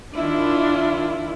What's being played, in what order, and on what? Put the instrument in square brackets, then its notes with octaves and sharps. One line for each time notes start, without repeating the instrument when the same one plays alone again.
[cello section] D#3 E4 [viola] D4 F4